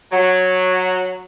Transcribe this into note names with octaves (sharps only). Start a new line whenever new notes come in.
F#3